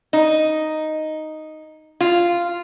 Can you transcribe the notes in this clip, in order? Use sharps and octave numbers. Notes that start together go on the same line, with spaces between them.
D#4
F4